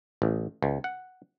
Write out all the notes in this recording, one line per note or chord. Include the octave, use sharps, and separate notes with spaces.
A1
C#2
F#5